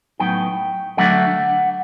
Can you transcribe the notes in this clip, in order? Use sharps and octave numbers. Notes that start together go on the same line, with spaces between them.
A2 F#3 B3 D#4 G5
D3 F#3 A3 D4 F#5